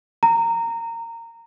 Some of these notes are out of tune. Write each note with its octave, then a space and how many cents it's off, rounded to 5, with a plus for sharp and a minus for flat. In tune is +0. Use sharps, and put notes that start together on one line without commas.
A#5 -20